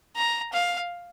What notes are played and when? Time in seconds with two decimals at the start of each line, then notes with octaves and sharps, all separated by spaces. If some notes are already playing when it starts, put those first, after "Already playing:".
0.16 A#5
0.53 F5